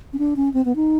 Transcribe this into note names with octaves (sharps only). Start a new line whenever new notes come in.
C#4
D4
C#4
C4
B3
D#4